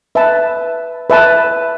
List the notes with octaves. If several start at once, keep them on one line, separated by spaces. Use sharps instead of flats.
B4 E5 A5
B4 E5 A5